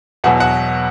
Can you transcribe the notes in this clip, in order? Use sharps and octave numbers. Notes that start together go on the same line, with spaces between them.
E2 B2 F#3 F#4 F#5
F#4 F#5